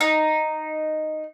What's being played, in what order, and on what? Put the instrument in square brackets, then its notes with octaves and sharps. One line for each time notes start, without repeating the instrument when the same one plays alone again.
[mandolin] D#4